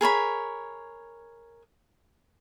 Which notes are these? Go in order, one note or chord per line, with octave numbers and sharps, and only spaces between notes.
G#4 A#4 C#5 B5